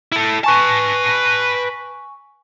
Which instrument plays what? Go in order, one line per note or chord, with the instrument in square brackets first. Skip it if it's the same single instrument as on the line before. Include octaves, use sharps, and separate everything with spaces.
[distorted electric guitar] E4 A4
[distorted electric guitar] B4 A5 [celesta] G#5 C#6